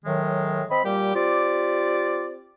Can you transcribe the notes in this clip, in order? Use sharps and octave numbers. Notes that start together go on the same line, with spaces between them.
A2 D#3 F#3 G#3
C4 D#5 B5
A#2 G3 G4
C4 F4 G4 D5